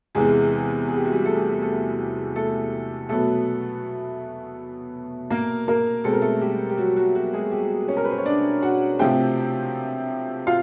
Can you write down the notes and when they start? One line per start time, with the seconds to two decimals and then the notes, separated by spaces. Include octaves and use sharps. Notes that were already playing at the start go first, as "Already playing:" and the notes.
0.15 E2 C3 E3 G#3 G#4
0.89 G#4
0.97 G4
1.05 F#4
1.13 G3 G4
1.25 A3 A4
1.62 A3 A4
2.36 A3 A4
3.09 B2 F#3 A3 B3 A4
5.30 A#3 A#4
5.68 A#3 A#4
6.04 B2 G#3 C4 A4
6.13 A#4
6.22 A3 A4
6.41 G3 G4
6.70 G4
6.78 F#3 F#4
6.96 F#3 F#4
7.15 F#3 F#4
7.33 G#3 G#4
7.51 G3 G4
7.88 C#4 C#5
7.97 A#4
8.05 B4
8.11 C5
8.18 C#5
8.25 D4 D5
8.62 F#4 F#5
8.99 C3 F3 A3 C4 G4 G5
10.47 F4 F5